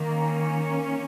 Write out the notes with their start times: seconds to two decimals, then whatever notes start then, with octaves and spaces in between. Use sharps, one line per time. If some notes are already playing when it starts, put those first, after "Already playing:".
Already playing: D#3 A#3
0.13 C#4